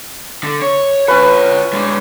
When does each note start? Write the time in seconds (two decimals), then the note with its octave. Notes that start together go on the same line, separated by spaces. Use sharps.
0.43 D3
0.62 C#5
1.08 C#4 F4 B4 C#5
1.73 G#3 D4